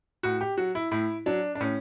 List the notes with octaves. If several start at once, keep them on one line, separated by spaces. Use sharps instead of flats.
A2 F#4
G4
F#3 F#4
E4
A2 E4
F#3 D4
D4
A2 C#4